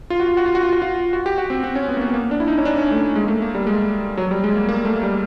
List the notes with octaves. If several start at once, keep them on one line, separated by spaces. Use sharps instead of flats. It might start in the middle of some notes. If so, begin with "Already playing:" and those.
F4
F#4
F4
F#4
F4
F#4
F4
F#4
F4
F#4
G4
F#4
C4
C4
C#4
B3
A#3
B3
A#3
D4
E4
D#4
C#4
D4
C#4
A3
G#3
A#3
A3
A#3
G3
G#3
F#3
G3
G#3
A#3
A#3
A3
G3